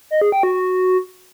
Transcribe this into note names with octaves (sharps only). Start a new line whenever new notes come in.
D#5
G#4
G5
F#4